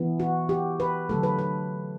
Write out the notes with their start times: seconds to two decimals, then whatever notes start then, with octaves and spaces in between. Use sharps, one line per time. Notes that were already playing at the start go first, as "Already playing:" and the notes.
Already playing: E3 B3
0.20 F#4
0.49 G4
0.80 B4
1.09 D3 F#3 A3 A4
1.23 B4
1.39 B4